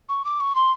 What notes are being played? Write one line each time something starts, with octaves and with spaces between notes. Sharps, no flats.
C#6
D6
C#6
C6